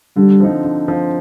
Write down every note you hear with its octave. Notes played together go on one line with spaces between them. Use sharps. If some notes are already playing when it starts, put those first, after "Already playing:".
D3 G3
F3 C4 D#4
D3
F3 C4 D#4